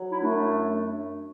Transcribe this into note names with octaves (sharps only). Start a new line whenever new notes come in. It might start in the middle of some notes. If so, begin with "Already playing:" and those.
Already playing: F#3
E4
F#2 A3 D4